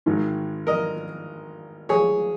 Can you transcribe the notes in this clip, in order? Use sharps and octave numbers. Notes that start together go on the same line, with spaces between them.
G#1 G#2 D#3
A#4 D#5
G#4 C#5